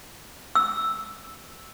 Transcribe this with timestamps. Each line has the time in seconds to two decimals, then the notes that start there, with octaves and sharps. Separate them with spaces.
0.55 E6